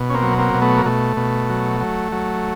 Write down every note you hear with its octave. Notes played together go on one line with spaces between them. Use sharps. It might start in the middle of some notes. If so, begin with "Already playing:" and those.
Already playing: B2
C#4
A#3 C4
F#3
A#3 C4
B2
A3 B3
A#3
B2 A3
B2
F#3
F#3
F#3